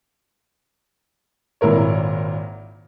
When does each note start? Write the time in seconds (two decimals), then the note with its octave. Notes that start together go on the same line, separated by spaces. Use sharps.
1.61 G#1 A#2 E4 A#4 C#5